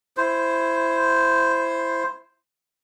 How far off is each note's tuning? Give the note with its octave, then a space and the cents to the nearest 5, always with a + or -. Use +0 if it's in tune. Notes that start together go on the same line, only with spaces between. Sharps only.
E4 +15 C5 +0